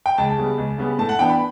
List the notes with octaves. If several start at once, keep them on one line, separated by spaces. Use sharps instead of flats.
G5
C#2 A5
C#3 G3 B3
C#2
C#3 G3 B3
A2 A5
F#5
E3 B3 D4 G5
B5